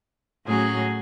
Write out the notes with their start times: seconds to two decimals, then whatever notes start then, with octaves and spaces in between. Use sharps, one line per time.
0.45 A2 F#3 C#4 G#4